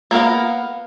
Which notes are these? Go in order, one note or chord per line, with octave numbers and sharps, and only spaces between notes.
A#3 B3 A#4 F5